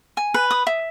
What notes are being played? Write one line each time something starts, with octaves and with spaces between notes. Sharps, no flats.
G#5
B4
D#6
E5